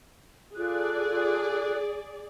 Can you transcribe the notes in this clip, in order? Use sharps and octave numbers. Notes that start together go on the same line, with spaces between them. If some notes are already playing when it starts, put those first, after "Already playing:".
F4 G#4 A4 D5 F#6